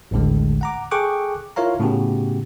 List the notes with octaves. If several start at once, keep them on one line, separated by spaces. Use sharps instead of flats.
A1 D#2 A2 D3 G#3
F#5 A#5 D6
G#4 A4 G5 C#6 D6 F#6
E4 F4 A#4 C#5 F5 A#5
A2 C#3 B3 F#4 G4